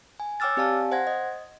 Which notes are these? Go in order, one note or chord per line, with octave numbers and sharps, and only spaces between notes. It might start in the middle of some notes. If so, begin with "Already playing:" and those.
G#5
C#5 G5 D6 E6 F6 A6
C4 G4 D5 F5 G#5 A5
C5 F#5 G#6 A#6
D#5